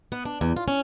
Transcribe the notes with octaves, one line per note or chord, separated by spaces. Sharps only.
B3
D4
E2
F4
C#4